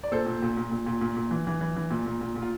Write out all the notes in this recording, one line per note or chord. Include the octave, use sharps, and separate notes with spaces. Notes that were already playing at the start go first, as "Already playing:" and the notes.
D5
A#2 A4 C5
A#2
A#2
A#2
A#2
A#2
A#2
A#2
E3
E3
E3
E3
A#2
A#2
A#2
A#2
F4